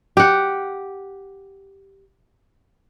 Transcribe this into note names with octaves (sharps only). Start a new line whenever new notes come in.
G4 F#5